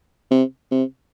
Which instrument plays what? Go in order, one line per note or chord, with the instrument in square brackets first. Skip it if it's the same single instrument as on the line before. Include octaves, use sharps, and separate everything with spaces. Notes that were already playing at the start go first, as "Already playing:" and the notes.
[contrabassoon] C3
C3